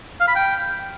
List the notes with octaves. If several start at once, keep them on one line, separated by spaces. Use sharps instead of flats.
F5
B5
G5